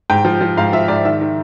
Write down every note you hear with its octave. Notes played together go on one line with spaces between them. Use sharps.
G#2 G5
F3
F3
G#2 F5
F3 E5
G#2 D5
D#3 E5
D#3